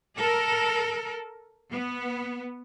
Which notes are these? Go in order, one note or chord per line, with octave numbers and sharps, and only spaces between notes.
A4 A#4
B3